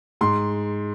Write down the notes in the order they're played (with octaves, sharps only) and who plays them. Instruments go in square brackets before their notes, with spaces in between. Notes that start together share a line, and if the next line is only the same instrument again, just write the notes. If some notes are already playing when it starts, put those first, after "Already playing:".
[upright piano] G#2 C6